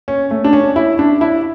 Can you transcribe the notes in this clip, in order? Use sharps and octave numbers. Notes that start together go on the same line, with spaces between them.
C#4
A3
D4
C#4
E4
D4
E4